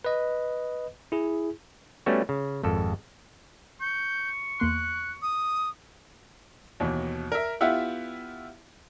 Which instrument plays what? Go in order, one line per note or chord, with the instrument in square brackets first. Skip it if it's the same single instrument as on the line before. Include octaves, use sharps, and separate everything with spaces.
[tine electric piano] B4 D#5
E4 G#4
[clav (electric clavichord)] G3 A3 B3 C#4 F#4
C#3
G#1 F2 A4
[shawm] C#6 [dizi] G6
[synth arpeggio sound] E2 A#3 C6 [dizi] F#6
[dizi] D#6
[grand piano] D#2 B2 E3
A#4 E5
B3 E4 F4 G4 E5 F#5